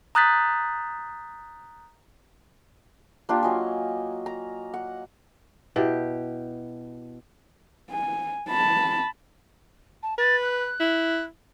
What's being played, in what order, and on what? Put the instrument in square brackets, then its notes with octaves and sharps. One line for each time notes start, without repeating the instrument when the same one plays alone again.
[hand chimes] A#5 D#6 F#6 G6 A6 B6
[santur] A#3 D4 F4 G4
F#3 D#5 G#5
A#5
F#5
[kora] B2 G4 [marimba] E4 E5
[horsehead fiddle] G#5
A5 B5
[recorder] A5
[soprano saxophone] B4 [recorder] A6
[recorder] F#6
[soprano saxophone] E4